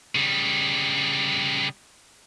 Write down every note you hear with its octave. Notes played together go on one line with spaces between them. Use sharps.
C#3 G3